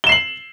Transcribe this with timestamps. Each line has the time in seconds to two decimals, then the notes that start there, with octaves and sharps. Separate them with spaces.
0.04 G7
0.07 E7
0.09 C7
0.12 F#7